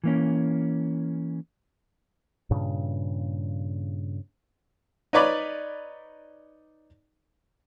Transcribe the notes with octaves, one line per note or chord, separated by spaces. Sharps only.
E3 A#3 C#4
G2 A#2 C#3
D#4 B4 C#5 D5 B5 D6